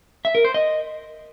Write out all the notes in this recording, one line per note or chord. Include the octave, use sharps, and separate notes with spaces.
E5
A#4
C5
D#5